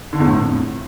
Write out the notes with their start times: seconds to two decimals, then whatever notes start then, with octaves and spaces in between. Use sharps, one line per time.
0.13 D3
0.20 E2
0.26 A2
0.33 F2